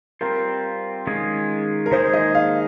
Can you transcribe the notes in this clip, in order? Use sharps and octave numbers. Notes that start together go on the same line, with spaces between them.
G3 C4 F4 A#4 C5
D#3 G#3 C#4 F4 G#4
A#4
D#3 G#3 D#4 G#4 C5
D#5
F5